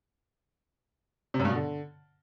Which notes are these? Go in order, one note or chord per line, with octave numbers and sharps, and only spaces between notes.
C3
F#2
G2
B2
D3